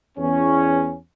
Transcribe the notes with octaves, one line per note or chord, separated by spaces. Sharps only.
E2 C#4